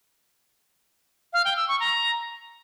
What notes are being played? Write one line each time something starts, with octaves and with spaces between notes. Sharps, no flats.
F5
G5
E6
C#6
A#5